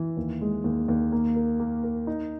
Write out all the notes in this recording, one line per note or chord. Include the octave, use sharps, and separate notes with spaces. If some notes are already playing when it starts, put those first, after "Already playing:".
Already playing: E3
D#2
G#3
D#2
D#2
A#3
A#4
A#3
A#4
D#4